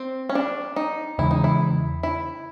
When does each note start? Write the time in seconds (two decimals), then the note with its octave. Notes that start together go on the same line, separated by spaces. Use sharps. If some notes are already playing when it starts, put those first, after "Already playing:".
Already playing: C4
0.29 C#4
0.35 D4
0.76 D#4
1.18 E2 C#3 E3 G#3 E4
1.31 D#4
1.44 E4
2.03 E4